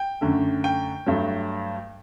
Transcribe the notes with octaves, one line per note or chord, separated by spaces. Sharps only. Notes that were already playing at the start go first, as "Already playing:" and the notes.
Already playing: G5
F#2 D3 A3
G5
G2 F#3 A3